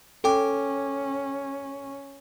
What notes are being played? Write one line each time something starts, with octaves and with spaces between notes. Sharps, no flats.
C#4 A4 G5 D6